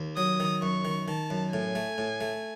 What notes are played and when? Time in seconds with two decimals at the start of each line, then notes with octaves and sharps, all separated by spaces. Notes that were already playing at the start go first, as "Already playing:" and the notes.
Already playing: D#2
0.17 F#3 D#6
0.40 D#3
0.62 F#2 C#6
0.85 D#3
1.08 D#3 A5
1.30 F#2
1.53 A2 G#5
1.75 A3
1.98 A2
2.21 A3